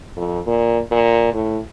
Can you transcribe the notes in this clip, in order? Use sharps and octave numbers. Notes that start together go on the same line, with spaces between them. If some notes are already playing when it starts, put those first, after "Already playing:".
F2
A#2
A#2
A2